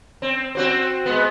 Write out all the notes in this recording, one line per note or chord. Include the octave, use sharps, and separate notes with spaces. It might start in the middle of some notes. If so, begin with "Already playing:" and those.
C4
C4 F#4 C5
G#3 B3